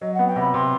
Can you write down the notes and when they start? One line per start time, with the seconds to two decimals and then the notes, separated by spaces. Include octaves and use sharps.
0.01 F#3 D#5
0.14 B3 F#5
0.27 G5
0.36 C3 B5
0.54 C3 C6